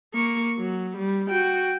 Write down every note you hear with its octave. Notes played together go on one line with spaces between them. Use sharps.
A#3 C#6
F#3
G3
F#4 G5